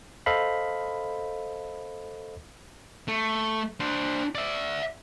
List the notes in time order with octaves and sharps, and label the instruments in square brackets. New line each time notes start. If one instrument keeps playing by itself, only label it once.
[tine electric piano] A4 C5 D#5 F5 B5
[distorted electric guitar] A3
D4 C5
D5 E5